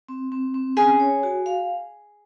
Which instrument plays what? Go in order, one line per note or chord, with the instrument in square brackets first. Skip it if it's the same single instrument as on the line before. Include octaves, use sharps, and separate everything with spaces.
[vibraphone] C4
C4
C4
[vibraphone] C#4 [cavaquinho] G#4
[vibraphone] C#5
F#4
F5